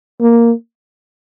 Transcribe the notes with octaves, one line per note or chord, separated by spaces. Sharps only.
A#3